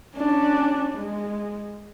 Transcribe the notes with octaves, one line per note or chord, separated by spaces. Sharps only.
C#4 D4
G#3